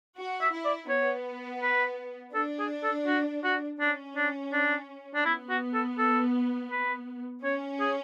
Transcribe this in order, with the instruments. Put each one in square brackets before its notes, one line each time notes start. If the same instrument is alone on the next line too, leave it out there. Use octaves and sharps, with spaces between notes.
[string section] F#4
[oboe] E5
[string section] E4
[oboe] D5
[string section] B3 [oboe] C#5
[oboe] B4
[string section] D4 [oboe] A4
[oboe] G#4
A4
F#4
F#4
[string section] C#4 [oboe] D4
[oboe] D4
D4
D4
[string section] B3 [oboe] E4
[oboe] F#4
A4
A4
B4
[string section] C#4 [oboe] C#5
[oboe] G#4